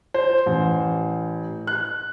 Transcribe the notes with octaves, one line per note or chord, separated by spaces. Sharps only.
C5
A1
F#6